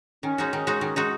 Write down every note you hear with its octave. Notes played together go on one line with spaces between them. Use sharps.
D#3 C#4
G#3 D#4 F#4
D#3
G#3 D#4 F#4
D#3
G#3 D#4 F#4